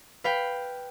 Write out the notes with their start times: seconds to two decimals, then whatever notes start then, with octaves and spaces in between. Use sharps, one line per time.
0.24 B4 F5 G5 B6